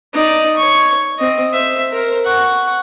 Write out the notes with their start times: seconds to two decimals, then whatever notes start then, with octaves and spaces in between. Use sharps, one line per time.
0.14 D#4 D5
0.57 C#5 C#6
1.18 C4 D#5
1.53 C5 E5
1.92 A#4 C5
2.25 F#5 C#6